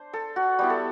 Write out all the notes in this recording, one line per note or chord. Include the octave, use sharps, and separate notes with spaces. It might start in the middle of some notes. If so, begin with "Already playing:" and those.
Already playing: D4 C5
A4
F#4
G3 B3 E4 G4
A4